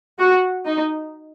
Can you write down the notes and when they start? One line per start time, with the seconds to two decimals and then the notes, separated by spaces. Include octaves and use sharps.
0.19 F#4
0.66 D#4